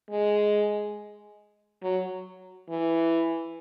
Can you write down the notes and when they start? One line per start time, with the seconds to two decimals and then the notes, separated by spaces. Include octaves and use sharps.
0.11 G#3
1.83 F#3
2.69 E3